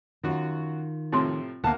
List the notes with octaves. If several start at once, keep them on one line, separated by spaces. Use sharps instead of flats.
F#2 D#3 F4 F#4
A2 C3 F3 C4 C6
D2 A#3 F5 F#5 A5